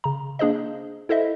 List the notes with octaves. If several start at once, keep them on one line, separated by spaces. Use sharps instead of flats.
C#3 A#5
A#3 D4 G#4 C5 D#5
E4 A4 C5 D#5 E5